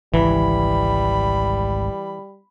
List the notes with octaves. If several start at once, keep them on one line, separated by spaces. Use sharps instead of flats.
G#1 C#2 E3 G3 B5